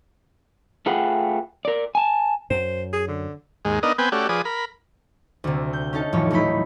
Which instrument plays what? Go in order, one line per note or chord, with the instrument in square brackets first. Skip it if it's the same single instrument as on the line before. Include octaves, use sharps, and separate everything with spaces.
[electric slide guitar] A3 F4 G#4 B4 F#5 G5
A#4 D5
G#5 A5
[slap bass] F#2 [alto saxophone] C5
[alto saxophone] G#4
D3
[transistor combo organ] D#2 G#2 G#3
B3 D4 D#4 A#4 D#5
B3 C4 B4 G5 G#5
A3 C#4 F#4 G4 D5
F3 G#4 B4 D5 D#6
A#4 B5
[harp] D2 C3
G6
C#4 D#4 A4 A5
D#1 F2 A2 E3 C#5
D#1 F#3 A3 D#4 E4 B5